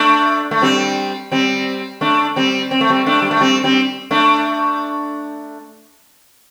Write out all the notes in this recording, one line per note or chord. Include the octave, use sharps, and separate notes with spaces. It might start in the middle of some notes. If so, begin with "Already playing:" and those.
Already playing: A3 D4
A3
G3 C4
G3 C4
A3 D4
G3 C4
C4
A3
G3 C4
A3 D4
G3
A3
G3 C4
G3 C4
A3 D4